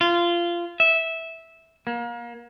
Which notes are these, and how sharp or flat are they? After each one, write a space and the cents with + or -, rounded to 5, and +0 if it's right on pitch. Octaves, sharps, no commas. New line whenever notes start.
F4 -20
E5 -10
A#3 +30